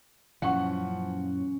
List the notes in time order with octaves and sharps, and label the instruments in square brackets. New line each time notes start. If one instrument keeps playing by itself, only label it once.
[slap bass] F#2 A#2 E3 [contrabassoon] F3 [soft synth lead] C#4 [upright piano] F#5 C#6